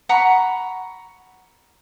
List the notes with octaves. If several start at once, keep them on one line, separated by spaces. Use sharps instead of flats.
F#5 A#5 B5 C#6